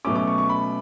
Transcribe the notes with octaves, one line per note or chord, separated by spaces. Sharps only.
B2 F#3 A3 C#4 D6
D6
C#6
C#6
B5